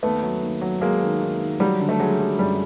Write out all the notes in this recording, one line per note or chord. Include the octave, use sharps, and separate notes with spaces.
D#2 A3 B3
F#3
D#2
F#3
F#3 G#3 A#3
D#3
D#3
D#3
F#3 G3
D3
A3
F#3 G#3
F#3
F#2 G3